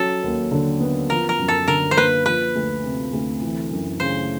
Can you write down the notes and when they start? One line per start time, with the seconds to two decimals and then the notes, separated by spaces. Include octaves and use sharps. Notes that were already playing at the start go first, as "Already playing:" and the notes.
Already playing: F#3 C#4 A4
0.23 D#2
0.51 D3
0.80 B3
1.10 F3 A#4
1.29 A#4
1.39 F#2
1.48 A4
1.68 D3 A#4
1.91 C5
1.97 A#3 B4
2.26 F3 B4
2.55 D2
2.84 C3
3.13 D2
3.42 E3
3.71 F#2
4.00 C#3 C5